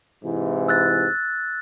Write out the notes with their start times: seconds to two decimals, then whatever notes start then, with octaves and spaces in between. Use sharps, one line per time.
0.23 G#2 C3 E3
0.69 E6 F#6 A6